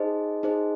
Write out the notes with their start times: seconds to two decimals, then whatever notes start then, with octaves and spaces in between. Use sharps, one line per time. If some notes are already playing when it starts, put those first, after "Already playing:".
Already playing: D#4 G#4 C5 D#5
0.43 D#4 G#4 C5 D#5